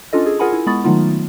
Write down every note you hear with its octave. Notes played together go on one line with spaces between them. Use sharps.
C#4 D4 F4 A4 D#5
G#4
F4 G#4 A#4 F#5 G#5 B5
E4
G#3 B3 B5 C#6 D#6 A6
D#3 F#3 A3 B3 D#4 F4